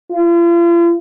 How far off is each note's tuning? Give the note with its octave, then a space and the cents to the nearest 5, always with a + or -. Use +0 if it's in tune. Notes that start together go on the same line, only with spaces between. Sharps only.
F4 -40